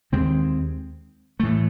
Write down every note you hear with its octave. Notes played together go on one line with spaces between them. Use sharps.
D#2 D#3 G#3 C4
A2 E3 A3